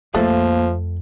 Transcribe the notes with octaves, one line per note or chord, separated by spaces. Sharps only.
F2 F3 A3 A#3